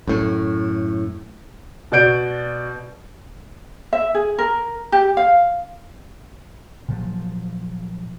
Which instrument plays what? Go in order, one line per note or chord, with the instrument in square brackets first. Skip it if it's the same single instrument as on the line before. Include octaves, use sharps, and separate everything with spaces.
[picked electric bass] F#2 A2
[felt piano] B2 F#4 D5 G6 D7
[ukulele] E5
G#4
A#4
G4
F5
[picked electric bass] A#2 F3 F#3